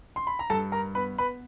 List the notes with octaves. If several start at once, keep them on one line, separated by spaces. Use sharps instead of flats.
C6
B5
A#5
G2 A4 A5
A#4 A#5
B3 B4 B5
B4 B5